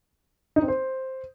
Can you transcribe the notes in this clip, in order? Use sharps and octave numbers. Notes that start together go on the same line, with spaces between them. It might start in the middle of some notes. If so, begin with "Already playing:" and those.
D#4
C4
C5